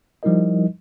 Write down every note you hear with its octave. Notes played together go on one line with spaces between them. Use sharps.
F3 G3 D#4 E4 A#4 D#5